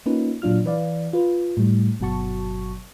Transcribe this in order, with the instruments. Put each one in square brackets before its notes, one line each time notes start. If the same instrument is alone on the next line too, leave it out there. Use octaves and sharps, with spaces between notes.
[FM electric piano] A#3 C#4 D#4 F4 B4
A#2 F#3 D4 F4 F6
E3 B4 D5 F5
F4 B4
A2 G3
G1 B2 F#3 F#4 A5 C#6